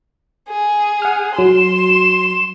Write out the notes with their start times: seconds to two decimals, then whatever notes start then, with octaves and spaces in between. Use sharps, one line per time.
0.49 G#4
1.02 F#5 F6
1.39 F#3 C6 E7